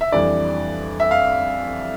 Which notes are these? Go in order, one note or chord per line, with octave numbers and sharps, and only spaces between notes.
E5
F2 E3 G3 D4 D5
E5
F5